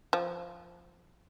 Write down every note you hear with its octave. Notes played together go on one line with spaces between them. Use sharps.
F3